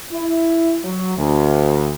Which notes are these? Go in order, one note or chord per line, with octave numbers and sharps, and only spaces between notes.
E4
F#3
D2